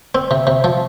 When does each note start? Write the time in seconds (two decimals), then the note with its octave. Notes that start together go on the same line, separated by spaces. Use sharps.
0.15 C4
0.31 C3
0.47 C3
0.64 F3